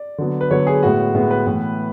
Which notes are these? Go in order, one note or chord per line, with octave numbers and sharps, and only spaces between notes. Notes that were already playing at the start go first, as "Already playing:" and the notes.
Already playing: D5
D3 F#3 B3
B4
D3 F#3 B3 C#5
G#4
A2 G#3 B3 F#4
A2 G#3 B3
B4
A2 E3 B3